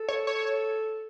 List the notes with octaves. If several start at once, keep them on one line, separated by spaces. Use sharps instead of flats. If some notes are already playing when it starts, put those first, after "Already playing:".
Already playing: A4
C#5
C#5